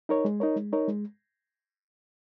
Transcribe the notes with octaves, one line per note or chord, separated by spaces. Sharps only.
D#4 A#4 C#5
G#3
D#4 A#4 C#5
G#3
D#4 A#4 C#5
G#3